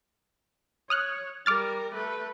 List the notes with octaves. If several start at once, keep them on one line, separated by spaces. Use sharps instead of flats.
C#5 D#6 F6 F#6
G3 A#4 D6 F6 A6
A3 B4